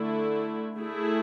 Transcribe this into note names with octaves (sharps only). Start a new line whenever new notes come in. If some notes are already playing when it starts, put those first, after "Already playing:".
Already playing: D3 A3 E4
A3 E4 G#4